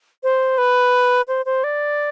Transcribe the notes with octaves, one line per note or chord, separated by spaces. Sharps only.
C5
B4
C5
C5
D5